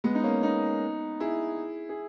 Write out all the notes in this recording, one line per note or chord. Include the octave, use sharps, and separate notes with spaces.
G#3 B3
D#4
A#3 C#4
B3 D#4
E4 G#4
G#4